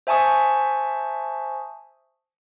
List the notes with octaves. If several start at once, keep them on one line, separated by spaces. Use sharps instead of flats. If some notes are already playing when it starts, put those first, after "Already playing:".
C5 E5 G#5 A5 C#6 D#6